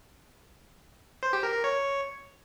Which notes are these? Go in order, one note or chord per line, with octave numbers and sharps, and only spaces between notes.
C5
G4
A#4
A#4
C#5